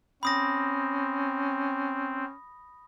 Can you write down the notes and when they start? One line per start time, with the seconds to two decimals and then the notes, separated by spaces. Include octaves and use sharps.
0.23 C4 C#4 B5 D#6 A#6